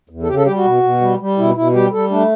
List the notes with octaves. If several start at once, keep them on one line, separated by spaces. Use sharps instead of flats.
E2
A4
C#3 G4
A4
G3 G4
F#4
B2
B2
G3
G3
B2 E4
B2 E4
G3 G4
G3 A4
A3 D4